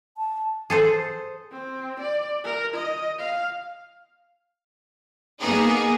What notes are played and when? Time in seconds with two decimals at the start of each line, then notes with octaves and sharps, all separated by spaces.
0.17 A5
0.70 G#4 A4 C5
1.51 C4
2.00 D5
2.44 A#4
2.74 D#5
3.19 F5
5.39 A#3 B3 D#4 G#4